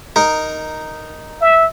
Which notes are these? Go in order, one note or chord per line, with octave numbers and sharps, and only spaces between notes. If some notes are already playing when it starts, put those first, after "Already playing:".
D#4 A#4
E5